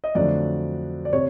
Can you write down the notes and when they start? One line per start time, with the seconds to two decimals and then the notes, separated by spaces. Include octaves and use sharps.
0.04 D#5
0.15 F2 D3 F#3 A3 D5
1.05 D5
1.13 C3 C#5